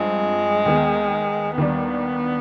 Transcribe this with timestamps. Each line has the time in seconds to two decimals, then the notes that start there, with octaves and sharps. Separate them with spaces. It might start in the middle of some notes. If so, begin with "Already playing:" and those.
Already playing: G2 F3 G#3 C4
0.66 D#2 D#3 B3
1.57 D#2 D#3 G3 B3 D4